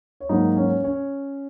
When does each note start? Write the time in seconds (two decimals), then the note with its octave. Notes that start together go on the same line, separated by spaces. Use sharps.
0.20 C#5
0.29 G#2 F#3 A#3 D#4 D#5
0.57 C#4 C#5
0.84 C#4 C#5